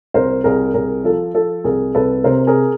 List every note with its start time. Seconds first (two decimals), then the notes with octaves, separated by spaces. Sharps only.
0.14 C2 A#4 C5
0.44 C2 G#4 A#4
0.74 C2 G#4 A#4
1.04 F3 A4
1.34 F3 A4
1.64 C2 G#4 A#4
1.95 C2 A4 B4
2.24 C3 A#4 C5
2.47 G#4 A#4